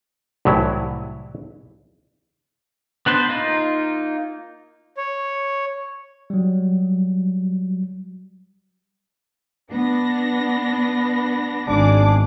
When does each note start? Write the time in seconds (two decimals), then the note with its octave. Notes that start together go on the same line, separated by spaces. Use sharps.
0.45 C2 A2 E3 F#3 E4
3.06 B3 D4 B4 C5
3.29 A#3 D#4 F4
4.97 C#5
6.30 F#3 G3
9.71 B3 D4 A#6
11.67 G#1 D4 G#4 D6